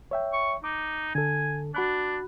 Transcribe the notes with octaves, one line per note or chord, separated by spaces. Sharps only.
C#5 E5 G5
C#6
D#4 D6
D3 A4 G#5
D4 F#4 B5 F#6